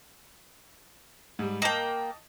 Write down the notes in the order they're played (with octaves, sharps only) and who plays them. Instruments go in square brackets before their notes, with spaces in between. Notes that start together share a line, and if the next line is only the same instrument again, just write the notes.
[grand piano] G#2 G3
[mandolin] A#3 G5 [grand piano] D#5 A5